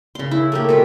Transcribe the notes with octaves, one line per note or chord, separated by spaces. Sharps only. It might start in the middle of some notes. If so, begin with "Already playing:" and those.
C#3 C6
E4
A3 A#3 G4
B2 G#3